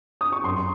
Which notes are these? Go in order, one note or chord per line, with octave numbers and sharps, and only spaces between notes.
D#6
C#6
F#2 C6